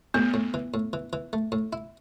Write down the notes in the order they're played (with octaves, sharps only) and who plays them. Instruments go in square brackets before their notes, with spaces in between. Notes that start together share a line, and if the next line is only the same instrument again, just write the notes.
[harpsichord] A2 [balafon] B3
[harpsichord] A2
E3
A2
E3
E3
A3
A2
E4